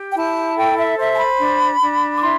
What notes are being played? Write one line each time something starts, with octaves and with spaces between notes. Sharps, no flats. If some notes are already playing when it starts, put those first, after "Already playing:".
Already playing: G4
G5
E4 A5
A4 G5
E5
C5 E5
A5
B5
D4
D4
D6
E4 C6